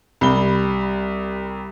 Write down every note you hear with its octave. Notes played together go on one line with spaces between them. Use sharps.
C2 G3 B5 G7